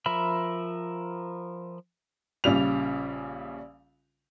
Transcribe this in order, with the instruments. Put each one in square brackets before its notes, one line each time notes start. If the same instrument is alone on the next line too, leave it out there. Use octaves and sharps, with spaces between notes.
[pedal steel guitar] F3 A#4 E5 B5
[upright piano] A#1 C#3 G3 F7